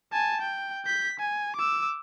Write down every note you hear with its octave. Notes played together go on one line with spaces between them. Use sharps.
G#5 A5
G5
G6 B6
G#5
D6 E6